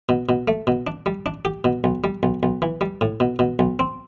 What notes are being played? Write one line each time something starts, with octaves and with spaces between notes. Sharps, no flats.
B2
B2
A3
B2
D4
G3
D4
G4
B2
B1
G3
B1
B1
E3
G3
A2
B2
B2
B1
C4